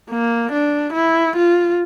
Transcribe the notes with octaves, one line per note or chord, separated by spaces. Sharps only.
A#3
D4
E4
F4